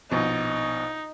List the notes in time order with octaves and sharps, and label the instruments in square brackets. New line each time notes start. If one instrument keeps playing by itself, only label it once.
[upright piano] A#1 B2 [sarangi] D#4